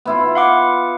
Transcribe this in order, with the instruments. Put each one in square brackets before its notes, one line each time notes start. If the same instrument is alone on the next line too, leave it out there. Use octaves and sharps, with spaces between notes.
[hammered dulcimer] B3 E4 F4
[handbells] F5 F#5 D6